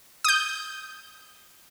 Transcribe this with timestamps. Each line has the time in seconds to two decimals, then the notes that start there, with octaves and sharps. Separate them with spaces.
0.24 D#6 G6